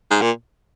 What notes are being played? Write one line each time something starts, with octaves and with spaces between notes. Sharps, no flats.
G#2
A#2